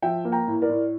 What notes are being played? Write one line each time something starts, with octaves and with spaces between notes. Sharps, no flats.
F3 E5 G5
A#3
G5 A#5
A2
A#4 D5
A2